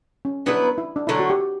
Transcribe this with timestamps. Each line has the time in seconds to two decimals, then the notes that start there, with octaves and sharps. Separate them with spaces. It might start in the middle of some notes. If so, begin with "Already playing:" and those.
0.25 C#4
0.46 F#3 B3 D4 E4 B4
0.78 E4
0.96 D4
1.07 D3 F#3 A3 E4
1.19 F#4
1.30 G4